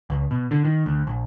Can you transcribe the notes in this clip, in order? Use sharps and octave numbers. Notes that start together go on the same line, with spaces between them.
C#2
B2
D3
D#3
D2
A#1